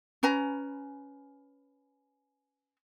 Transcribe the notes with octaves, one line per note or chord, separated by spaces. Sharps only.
C#4 B4 G#5 A#5